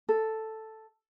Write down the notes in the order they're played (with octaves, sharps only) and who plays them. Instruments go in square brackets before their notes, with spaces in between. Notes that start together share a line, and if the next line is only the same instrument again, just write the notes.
[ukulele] A4